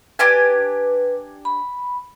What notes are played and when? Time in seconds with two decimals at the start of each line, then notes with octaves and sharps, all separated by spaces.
0.19 D4 G4 B4 G#5
1.45 B5